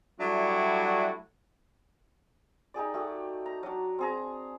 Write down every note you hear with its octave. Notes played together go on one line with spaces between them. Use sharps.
F#3 G3 A3 D4 E4 F#4
D#4 G4 G#4 D5
A3 F#4 G4
A#5
F#3 D4
C4 G#4 A#5